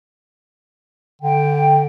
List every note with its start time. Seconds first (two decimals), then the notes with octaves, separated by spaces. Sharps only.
1.22 D3 G5